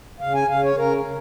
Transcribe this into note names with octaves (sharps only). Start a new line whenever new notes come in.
C#3 F5
G#5
C#3 F5
C#5
C#3 A#4
C#3